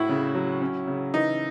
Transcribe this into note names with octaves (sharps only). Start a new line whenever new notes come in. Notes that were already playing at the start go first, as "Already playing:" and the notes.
Already playing: A2 E4 F#4
C#3
F#3
C#4
C#3
E3 D#4